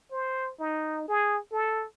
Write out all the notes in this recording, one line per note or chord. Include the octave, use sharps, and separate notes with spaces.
C5
D#4
G#4
A4